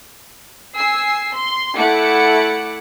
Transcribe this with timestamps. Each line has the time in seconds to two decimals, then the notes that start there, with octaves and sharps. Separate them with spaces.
0.74 G#5 E6 C7
1.32 C6
1.77 A3 E4 F#5 D6 C#7